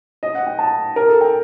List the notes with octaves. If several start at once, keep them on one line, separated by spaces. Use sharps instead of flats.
D#5
F#5
G5
A5
A#4
A4
G5